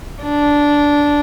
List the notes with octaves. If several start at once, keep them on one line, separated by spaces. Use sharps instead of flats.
D4